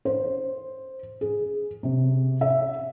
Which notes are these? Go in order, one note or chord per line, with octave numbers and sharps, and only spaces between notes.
C5
G#4
C3
E5